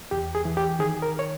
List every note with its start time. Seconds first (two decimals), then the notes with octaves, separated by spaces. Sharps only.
0.11 E2 G4
0.35 G#4
0.45 E3
0.57 G4
0.79 D#3 G#4
1.02 A#4
1.19 C#5